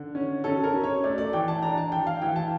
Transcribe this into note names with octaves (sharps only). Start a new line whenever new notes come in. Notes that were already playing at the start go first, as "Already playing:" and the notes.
Already playing: D3
C#4
C#4 A4
A#4
C#4
C#5
A3 D5
D5
E3 G5
A5
D4 A#5
A5
E3 G5
F5
E3 G5
A5